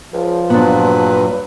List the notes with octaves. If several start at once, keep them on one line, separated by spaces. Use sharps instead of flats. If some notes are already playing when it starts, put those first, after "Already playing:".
C#2 F3
G2 A#2 F#3 B3 D4 B4